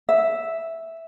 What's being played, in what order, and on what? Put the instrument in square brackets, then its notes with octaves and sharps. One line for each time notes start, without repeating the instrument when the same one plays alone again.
[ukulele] E5